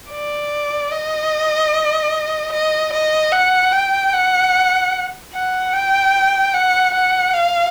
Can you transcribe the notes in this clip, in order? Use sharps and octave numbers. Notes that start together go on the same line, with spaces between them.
D5
D#5
D#5
D#5
F#5
G5
F#5
F#5
G5
F#5
F#5
F5